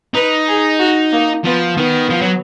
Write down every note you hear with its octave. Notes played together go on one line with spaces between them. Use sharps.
D#4 B4
G#4
F#4
A#3
F3 B3
D#3 B3
F3
F#3